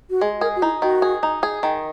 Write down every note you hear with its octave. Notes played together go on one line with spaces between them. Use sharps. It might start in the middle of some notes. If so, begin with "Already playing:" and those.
F#4
G#3 G#4
G#4 A#4
F#4
D#4 E4
D#3 F#4
G#4
D#4
G#4
D#3